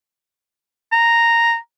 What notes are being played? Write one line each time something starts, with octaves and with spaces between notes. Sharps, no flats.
A#5